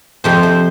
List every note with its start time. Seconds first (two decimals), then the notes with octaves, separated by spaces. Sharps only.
0.24 F2 C3 F3 C5
0.43 C5